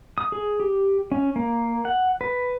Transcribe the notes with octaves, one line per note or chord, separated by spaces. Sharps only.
D#6
G#4
G4
C#4
A#3
F#5
B4